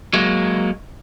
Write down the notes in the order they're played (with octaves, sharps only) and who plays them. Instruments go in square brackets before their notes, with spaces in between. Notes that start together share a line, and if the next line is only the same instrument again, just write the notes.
[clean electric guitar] F#3 G#3 A#3